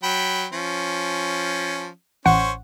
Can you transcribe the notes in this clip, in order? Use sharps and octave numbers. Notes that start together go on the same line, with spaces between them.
F#3 G5 B5
F3 C#4
A1 C#4 C5 F#5 C#6